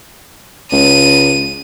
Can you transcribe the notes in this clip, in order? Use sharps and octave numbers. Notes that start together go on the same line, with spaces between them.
C#2 D#7